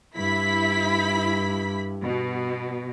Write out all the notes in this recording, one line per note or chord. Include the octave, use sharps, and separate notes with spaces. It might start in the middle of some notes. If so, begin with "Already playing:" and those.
G2 E4 B5 B6
B2